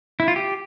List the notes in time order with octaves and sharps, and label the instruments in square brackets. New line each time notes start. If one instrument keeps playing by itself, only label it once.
[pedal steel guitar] E4
F4
G4